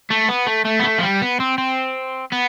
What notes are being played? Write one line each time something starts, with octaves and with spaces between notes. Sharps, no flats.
A3
B3
A3
A3
B3
A3
F3
G3
B3
C4
C4
B3